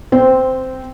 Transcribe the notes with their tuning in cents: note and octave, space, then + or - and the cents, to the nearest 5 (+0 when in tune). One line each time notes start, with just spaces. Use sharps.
C4 +0 C5 -15